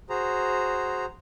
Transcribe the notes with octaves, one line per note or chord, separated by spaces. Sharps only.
F#4 G#4 C5 A#5